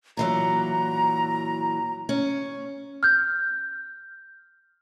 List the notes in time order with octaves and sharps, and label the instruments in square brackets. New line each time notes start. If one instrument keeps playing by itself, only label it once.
[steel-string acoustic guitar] A#2 E3 F#3 [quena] A#5
[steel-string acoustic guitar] C#4
[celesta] F6 G6